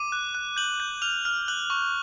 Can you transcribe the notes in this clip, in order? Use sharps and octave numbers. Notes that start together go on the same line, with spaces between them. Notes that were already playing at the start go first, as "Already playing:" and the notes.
Already playing: D6 D#7
F#6
F#6
G6 F#7
G6
F6 F7
F6
F#6 F#7
C#6